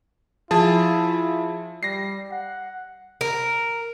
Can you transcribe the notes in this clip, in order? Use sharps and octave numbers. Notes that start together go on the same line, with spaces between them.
F3 E4 G#4 A5
G3 A#6 C7
F#5
A#4